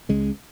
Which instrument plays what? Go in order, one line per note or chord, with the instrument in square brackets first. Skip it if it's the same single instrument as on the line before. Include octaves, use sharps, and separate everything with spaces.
[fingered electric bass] C#2 C#3 G#3 C#4